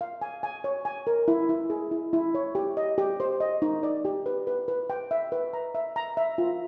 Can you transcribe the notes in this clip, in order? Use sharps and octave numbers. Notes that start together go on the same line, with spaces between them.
F5
G#5
G#5
C#5
G#5
A#4
E4
E4
G#4
E4
E4
C#5
G4
D#5
G4
C5
D#5
D#4
D5
G4
B4
B4
B4
G5
E5
B4
A#5
E5
A#5
E5
F4